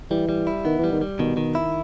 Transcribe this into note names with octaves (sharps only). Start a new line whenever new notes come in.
E3 G3
G3
E4
D#3 B3
E3
G3
D#3
G3
B2 D#3
D#3
E4